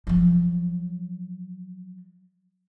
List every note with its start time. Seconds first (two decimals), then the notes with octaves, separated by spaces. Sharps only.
0.07 F3 F#3